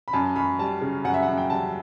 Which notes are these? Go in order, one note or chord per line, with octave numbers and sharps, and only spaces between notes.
B5
F#2 A5
F#2 B5
G3 A5
C#3
F#2 F#5
E5
F#5
F#2
G5
G3 A5